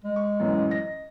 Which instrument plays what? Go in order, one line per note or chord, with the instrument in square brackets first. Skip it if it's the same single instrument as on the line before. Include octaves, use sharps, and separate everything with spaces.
[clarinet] G#3
[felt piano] C#6
A1 F#2 E3
D#5 A#6